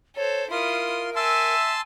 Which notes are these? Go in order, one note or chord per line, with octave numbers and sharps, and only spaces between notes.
A4 C5 C#5
E4 F4 A#4 C6 D#6
E5 G#5 A5 C6 E6